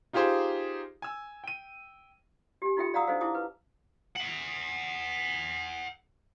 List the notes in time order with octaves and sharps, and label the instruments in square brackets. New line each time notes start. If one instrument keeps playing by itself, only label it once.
[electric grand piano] D#4 F4 G4 G#4 C5
G#5 E6
G5 D#7
[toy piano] G4 G#5
D#4 F4 F#4 A4 E5 G5
D5 F5 F#5 A#5 D#6 E6
D4 D#4 A4 C5 F5
E4 A5 D6 D#6
B4
[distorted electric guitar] E5 F#5